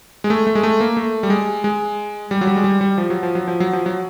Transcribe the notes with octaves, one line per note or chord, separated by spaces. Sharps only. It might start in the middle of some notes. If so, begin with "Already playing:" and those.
G#3
A3
A3
G#3
A3
A#3
A3
G3
G#3
G#3
G3
F#3
G3
G#3
G3
G3
F3
F#3
F3
F#3
F3
F#3
F3
F#3